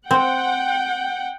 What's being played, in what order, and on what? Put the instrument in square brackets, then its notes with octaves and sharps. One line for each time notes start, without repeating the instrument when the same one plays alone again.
[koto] C4 [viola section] F#5 G5